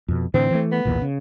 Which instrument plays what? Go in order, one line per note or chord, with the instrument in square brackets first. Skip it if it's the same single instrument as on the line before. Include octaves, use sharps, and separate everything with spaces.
[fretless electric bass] F2 B2
[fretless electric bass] A2 D3 E3 [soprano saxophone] C4
[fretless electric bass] E3 A3
[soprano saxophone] B3
[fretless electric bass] B1 E2 A#2
C#3